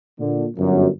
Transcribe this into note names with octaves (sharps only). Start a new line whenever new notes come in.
A#2 D3
G1 F#2